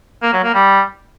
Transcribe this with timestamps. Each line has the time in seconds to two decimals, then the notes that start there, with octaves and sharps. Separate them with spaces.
0.23 A#3
0.33 F#3
0.44 A#3
0.54 G3